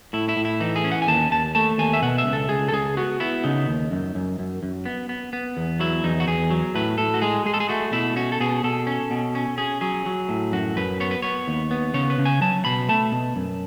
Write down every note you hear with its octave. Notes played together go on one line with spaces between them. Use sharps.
A2 E4
E4
A2
E4
E3 D#4
G#4
C#4
F#5
G#5
D#2 A5
D#2 A5
A3 A5
D#2 G#5
E5
B2 F#5
E5
C#2
A4
C#2 G#4
A4
C#2 G#4
B3 F#4
B3 E4
C#3 D#4
D#2
F#2
F#2
F#2
F#2
B3
B3
B3
E2
F#3 E4
E2 D#4
F#4
E2 G#4
F#3
A2 B4
A2 A4
F#4
G#3 G#4
G#3 G#4
A4
G#4
A3 F#4
B2 E4
C#4 F#4
A4
B2 G#4
B2 A4
C#4
B2
C#4
C#4 G#4
F#3 G#4
F#3
A2
F#2 F#4
F#2 B4
B3 C#5
B4
B3 C#5
D#2
B3
C#3 C#5
B4
C#3
G#5
F#3 A5
B2 B5
A3 A5
B2
F#2